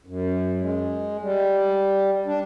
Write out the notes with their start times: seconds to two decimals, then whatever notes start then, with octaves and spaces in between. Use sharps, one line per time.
0.06 F#2
0.61 G#3
1.21 G3
2.26 D4